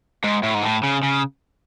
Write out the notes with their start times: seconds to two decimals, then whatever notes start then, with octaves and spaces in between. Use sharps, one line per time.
0.24 G#2
0.43 A2
0.54 G#2
0.63 A2
0.83 C#3
1.03 C#3